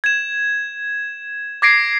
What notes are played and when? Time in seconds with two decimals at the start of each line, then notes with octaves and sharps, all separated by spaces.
0.04 G#6 E7
1.62 D6 G#6 A#6 C7 D7